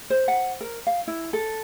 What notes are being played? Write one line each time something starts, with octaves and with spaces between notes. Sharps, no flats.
C5
F#5
A#4
F5
E4
A4